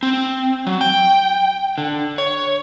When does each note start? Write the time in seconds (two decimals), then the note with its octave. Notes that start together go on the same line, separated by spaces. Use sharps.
0.03 C4
0.67 F#3
0.81 G5
1.78 D3
2.18 C#5